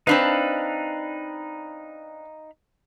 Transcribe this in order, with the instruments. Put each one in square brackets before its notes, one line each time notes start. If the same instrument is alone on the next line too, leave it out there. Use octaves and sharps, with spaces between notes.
[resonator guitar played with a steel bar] C4 D4 B4 [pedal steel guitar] D#4 F5 B5